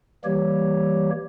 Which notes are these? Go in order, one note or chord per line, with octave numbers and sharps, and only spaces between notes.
E3 G3 A#3 G4 C#5